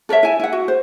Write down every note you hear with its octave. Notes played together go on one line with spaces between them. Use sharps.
A4 A#4 C#5 E5
E4 G#5
E4 F#5
F#4
C5